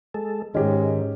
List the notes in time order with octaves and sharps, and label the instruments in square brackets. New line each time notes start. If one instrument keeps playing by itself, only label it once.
[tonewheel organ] G#3 A4
[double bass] G#2 [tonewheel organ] D#3 [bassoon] G#3 [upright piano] C#4 G4